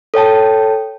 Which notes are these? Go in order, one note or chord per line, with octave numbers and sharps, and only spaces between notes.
A4 C#5 G5 A5